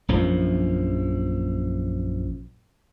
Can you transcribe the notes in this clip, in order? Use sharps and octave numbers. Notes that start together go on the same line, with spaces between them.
A#1 F#2 F3